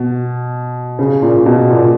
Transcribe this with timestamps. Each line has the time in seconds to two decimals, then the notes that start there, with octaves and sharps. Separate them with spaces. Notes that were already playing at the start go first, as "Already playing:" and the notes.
Already playing: B2
0.99 C#3
1.22 A#2
1.46 B2
1.70 A#2